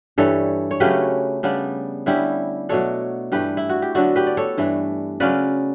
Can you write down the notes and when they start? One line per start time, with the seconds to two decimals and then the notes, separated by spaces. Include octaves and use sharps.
0.18 G2 E3 G3 A4 C#5
0.71 C#5
0.80 C#3 F#3 A3 C#4 G4 B4
1.43 C#3 G3 B3 D4
2.06 D3 G3 C#4 E4 G4
2.69 B2 F#3 A3 D4 A4 C#5
3.32 G2 E3 A3 D4 G4 B4
3.57 E4
3.69 F#4
3.82 G4
3.95 D3 F#3 B3 D4 F#4 A4
4.16 G4 B4
4.27 D5
4.37 A4 C#5
4.57 G2 E3 A3 D4
5.20 C#3 F#3 C#4 B4 D5